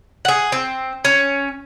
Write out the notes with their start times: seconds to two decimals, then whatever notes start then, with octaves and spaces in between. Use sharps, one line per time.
0.25 G#4 F#5
0.52 C4
1.05 C#4